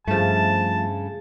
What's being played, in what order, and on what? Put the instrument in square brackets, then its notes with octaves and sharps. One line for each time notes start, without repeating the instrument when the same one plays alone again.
[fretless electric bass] G2 [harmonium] C#3 [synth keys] F3 A3 [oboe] A5